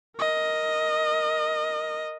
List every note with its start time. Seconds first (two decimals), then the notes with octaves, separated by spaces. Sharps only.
0.17 A#4 D#5